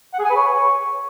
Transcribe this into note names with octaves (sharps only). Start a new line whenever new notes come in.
F#5
G#4
G#5
B4
C#5